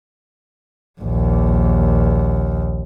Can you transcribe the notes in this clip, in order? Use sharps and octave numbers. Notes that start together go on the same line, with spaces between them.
A#1 D#2